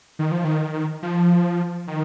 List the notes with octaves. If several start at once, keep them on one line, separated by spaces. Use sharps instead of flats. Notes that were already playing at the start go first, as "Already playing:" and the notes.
D#3
F3
D#3
F3
D#3